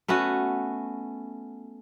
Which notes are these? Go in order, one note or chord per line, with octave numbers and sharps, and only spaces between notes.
A3 B3 C#4 F#4